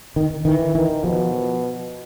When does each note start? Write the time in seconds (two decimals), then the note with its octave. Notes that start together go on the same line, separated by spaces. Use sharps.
0.16 D#3
0.45 D#3 E3
0.75 D#3 E3
1.04 B2 F3